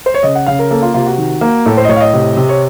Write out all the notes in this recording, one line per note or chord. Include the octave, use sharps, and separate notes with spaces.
C5
C#5
C#3 D#5
F#5
C#3 F5
A#4
A#3 A4
F4
C3 F4
F#4
D#3
A#3
A2 A4
C5
D#5
A2 C#5
F5
D#5
C3
C3
C#5